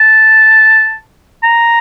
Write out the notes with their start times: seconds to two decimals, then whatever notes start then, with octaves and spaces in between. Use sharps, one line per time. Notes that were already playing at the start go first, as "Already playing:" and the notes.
Already playing: A5
1.43 A#5